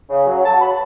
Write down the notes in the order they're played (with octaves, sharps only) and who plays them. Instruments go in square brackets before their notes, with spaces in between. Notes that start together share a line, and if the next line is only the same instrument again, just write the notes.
[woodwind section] C#3
F#3
F#3 A5
B5